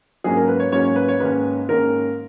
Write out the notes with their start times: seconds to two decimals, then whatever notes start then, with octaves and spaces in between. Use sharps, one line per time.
0.24 G#2 F#3 A#3 C#4 G#4
0.36 A#4
0.48 B4
0.60 C#5
0.72 G#2 F#3 A#3 C#4 C#5
0.84 C#5
0.96 B4
1.08 C#5
1.20 G#2 D#3 A#3 C#4 B4
1.68 G#2 D#3 A#3 C#4 A#4